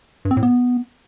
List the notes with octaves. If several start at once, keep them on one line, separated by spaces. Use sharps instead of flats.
G2
C4
A2
B3